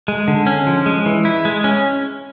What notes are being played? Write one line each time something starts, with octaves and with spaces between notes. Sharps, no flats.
G#3
D3
C#4
F3
G#3
E3
E4
G#3
C#4